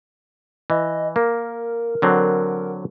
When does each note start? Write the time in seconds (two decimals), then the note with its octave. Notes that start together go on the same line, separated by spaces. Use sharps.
0.70 E3 D#5
1.16 A#3 A#4
2.02 D3 F#3 C4